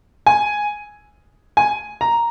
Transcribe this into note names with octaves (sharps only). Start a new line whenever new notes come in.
G#5
G#5
A#5